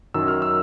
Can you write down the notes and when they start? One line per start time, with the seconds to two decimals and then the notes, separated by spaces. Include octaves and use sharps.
0.14 F#2 D#3 F#3 E6
0.28 F6
0.42 E6